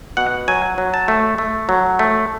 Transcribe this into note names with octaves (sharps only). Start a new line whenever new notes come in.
B2 F#5
F#3 G#5
F#3
A5
A3
A3
F#3
A3